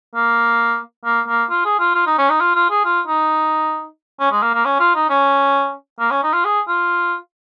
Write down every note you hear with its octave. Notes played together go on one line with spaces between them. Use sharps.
A#3
A#3
A#3
F4
G#4
F4
F4
D#4
C#4
D#4
F4
F4
G#4
F4
D#4
C#4
G#3
A#3
A#3
C#4
F4
D#4
C#4
A#3
C#4
D#4
F4
G#4
F4